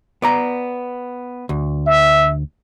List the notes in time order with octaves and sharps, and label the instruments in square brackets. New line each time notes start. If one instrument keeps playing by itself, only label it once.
[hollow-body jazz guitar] B3 D5 A#5
D2
[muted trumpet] E5